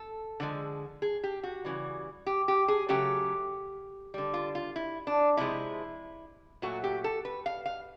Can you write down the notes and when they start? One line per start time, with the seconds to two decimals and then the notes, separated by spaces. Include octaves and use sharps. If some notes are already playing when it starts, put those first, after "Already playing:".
Already playing: A4
0.40 D3 F3 G#3
1.02 G#4
1.24 G4
1.43 F#4
1.65 C#3 E3 G3
2.26 G4
2.48 G4
2.68 G#4
2.89 C#3 F#3 A3 G4
4.14 D3 G3
4.34 F4
4.55 F4
4.76 E4
5.07 D4
5.37 C3 F3 G#3 E4
6.62 A#2 F#3 A3 F#4
6.84 G4
7.04 A4
7.25 B4
7.46 F5
7.66 F5